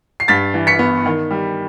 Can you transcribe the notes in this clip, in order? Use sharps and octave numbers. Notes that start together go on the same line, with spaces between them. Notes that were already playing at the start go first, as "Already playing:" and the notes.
C7
G2 A6 B6
E3
B6 C#7
B3
D#3
G3